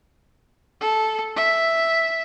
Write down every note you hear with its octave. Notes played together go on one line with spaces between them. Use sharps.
A4
E5